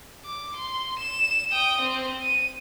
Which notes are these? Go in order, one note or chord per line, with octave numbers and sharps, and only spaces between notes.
D6
C6
E7
G5 D#6
C4
D#7